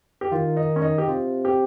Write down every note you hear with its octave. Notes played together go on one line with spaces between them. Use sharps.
G4
D#3 F4
D#4
C#4
D#4
G4
C3 F4
G4